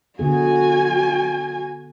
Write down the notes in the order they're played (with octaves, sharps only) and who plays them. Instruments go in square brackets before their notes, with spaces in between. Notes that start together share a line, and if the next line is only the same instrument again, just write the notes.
[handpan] D3 B3 G#4 [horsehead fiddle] F#4 G#5